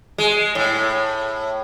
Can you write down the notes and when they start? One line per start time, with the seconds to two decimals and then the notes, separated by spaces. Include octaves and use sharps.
0.18 G#3
0.55 A2